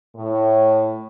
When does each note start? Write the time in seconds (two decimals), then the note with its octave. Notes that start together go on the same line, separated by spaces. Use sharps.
0.16 A2